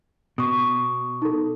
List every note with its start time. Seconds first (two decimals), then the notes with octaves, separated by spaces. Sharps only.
0.38 B2 C#6 D#6
1.22 D#4 A4